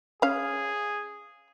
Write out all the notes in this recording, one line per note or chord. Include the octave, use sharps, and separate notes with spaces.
C#4 G#4 F5